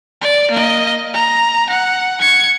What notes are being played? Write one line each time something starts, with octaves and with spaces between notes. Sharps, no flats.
D5
A#3 D#5
A#5
F#5
G#6 C#7